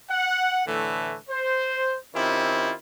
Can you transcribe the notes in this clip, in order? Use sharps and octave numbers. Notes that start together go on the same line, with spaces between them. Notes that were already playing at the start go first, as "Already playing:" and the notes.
F#5
A2 D3 E3 A3
C5
D#3 C4 C#4 E4 F4 G4